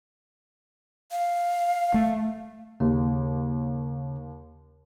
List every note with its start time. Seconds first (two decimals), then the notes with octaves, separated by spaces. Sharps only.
1.11 F5
1.94 A3
2.80 D#2 C#3 A#3